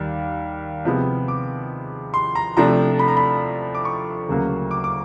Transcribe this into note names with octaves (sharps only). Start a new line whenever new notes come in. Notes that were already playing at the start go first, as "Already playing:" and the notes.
Already playing: D#2 G3
C3 F3 G#3 B3
D6
C6
A#5
C3 F3 A3 D4 A#5
B5
A#5
B5
D6
C#6
D2 C#3 F#3 A#3
D6
D6